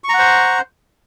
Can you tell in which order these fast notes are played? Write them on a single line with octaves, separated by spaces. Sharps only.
C#6 A#5 F#5 C5